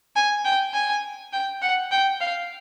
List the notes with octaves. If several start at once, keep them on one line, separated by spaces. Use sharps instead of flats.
G#5
G5
G#5
G5
F#5
G5
F5